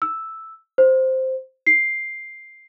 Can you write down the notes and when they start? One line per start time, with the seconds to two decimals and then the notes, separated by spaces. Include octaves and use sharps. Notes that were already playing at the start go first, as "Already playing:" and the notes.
0.02 E6
0.78 C5
1.67 C7